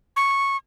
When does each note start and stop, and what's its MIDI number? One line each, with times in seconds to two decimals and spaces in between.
0.16 0.57 85